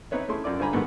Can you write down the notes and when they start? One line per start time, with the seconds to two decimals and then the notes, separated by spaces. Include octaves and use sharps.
0.11 C4 D#4 B4 C#5 E5
0.29 A3 C#4 E4 G#4 A4 C6
0.44 F#2 F4 D5 D6
0.59 G2 D3 C5 G#5 A#5 B5
0.73 G#2 D#3 G3 A3 B3